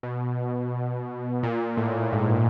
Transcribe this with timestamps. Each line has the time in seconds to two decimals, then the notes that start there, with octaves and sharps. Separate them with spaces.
0.03 B2
1.43 A#2
1.77 A2
2.13 G#2